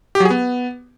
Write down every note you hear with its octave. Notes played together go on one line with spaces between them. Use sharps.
G4
F#3
G#4
B3